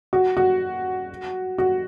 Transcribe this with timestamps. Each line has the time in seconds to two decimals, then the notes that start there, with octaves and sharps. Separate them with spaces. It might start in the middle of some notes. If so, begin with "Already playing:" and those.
0.13 F#4
0.37 F#4
1.58 F#4